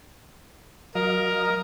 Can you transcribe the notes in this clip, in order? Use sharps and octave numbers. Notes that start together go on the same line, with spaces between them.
F#3 A#4 D#5 F5